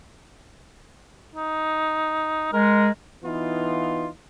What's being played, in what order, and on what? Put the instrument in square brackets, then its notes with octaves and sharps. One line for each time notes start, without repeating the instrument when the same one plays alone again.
[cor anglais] D#4
[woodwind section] G#3 [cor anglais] A#4
[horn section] E3 B3 D#4 F4